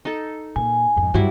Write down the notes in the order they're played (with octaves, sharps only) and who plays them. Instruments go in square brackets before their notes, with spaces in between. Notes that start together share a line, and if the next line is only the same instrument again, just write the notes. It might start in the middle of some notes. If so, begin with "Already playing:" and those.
[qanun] D#4 A4
[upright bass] A#2 [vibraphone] G#5
[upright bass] F2 G#2
[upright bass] G2 [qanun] F#3 G3 E4